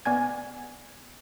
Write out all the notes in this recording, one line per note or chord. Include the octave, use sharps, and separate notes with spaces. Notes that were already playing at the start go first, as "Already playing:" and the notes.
B3 D5 G#5 G#6